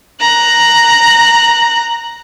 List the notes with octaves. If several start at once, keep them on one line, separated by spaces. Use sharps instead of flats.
A#5 F#6